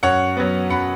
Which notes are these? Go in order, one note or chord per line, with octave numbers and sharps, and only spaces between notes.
F#2 C#5 F#5
F#3 B3
F#2 F#5 B5